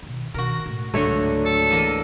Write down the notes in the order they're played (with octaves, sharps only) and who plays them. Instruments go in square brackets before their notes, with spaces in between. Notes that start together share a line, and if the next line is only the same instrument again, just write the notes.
[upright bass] B2 D#3
[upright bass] B2 D#3 [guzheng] F#4 A#4
[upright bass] A2
[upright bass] C#2 G#2 [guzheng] D3 F#3 [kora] A3 C#5
[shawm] A4
[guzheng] E2 A#3 D#5